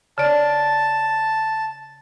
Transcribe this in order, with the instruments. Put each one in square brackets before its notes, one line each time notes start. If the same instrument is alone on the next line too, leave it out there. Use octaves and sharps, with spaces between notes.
[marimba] C#3 D5 [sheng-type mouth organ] A5